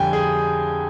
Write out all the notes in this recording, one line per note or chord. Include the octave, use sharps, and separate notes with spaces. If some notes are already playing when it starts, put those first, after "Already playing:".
Already playing: F2 D3 G3 G5 G#5
G#4